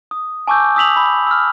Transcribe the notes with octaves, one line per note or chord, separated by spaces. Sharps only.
D#6
G#5 A5 C#6 D6 E6 G6
D#6 E6 B6 F7 F#7
B5
E6 F6